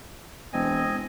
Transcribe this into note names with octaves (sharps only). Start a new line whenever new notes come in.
E1 C4 D#5 G#5